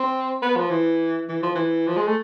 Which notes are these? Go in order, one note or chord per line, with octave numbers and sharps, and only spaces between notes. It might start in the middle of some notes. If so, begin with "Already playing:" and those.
Already playing: C4
B3
F3
E3
E3
F3
E3
F3
G#3
A3